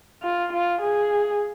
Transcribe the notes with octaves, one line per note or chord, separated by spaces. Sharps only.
F4
F4
G#4